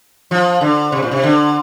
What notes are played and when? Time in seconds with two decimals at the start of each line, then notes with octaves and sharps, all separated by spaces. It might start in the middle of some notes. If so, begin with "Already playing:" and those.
0.31 F3
0.61 D3
0.92 C3
1.02 A#2
1.11 C3
1.24 D3